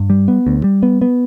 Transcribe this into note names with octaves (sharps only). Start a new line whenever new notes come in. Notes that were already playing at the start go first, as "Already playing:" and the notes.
Already playing: G2
G3
B3
D2
G3
B3
B3